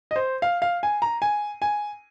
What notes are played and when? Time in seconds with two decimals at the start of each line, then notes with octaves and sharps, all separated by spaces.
0.11 D#5
0.16 C5
0.42 F5
0.62 F5
0.83 G#5
1.02 A#5
1.22 G#5
1.62 G#5